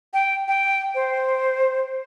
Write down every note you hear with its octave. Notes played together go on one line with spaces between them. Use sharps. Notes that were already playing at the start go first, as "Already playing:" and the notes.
G5
G5
C5